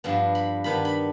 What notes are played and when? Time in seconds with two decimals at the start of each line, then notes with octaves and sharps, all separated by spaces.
0.04 G2 F3 B3 D4
0.35 B5
0.64 D#3 B3 D4 B5
0.85 B5